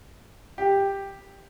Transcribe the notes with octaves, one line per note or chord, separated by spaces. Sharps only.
G4